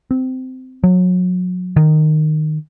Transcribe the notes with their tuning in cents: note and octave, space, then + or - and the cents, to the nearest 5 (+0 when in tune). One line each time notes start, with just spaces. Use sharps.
C4 -20
F#3 -30
D#3 -15